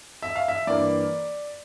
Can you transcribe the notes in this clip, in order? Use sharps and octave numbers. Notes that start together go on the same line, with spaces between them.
E5
F5
E5
G2 E3 A#3 D5